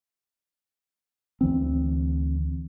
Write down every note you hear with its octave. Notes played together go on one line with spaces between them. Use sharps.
D2 E3 C4